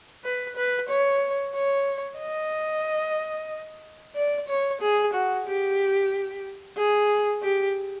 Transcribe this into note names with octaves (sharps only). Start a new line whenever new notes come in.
B4
B4
C#5
C#5
D#5
D5
C#5
G#4
F#4
G4
G#4
G4